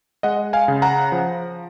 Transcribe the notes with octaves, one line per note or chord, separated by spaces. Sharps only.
G#3 D#5 F#5
F5 G#5
C#3
F#5 A#5
F3